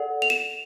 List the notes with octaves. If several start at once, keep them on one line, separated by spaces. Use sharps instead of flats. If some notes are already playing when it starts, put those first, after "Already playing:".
Already playing: A4 D5 F#5
F7
E7